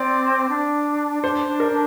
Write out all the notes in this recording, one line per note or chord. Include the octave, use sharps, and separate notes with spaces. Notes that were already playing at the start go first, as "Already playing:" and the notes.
Already playing: C4 D5
D4
D4 C5
D4
A#4
D4